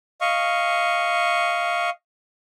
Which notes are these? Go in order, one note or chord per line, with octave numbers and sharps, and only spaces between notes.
D#5 F5 C#6